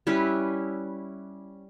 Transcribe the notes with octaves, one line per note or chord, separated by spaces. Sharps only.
G3 C#4 E4 B4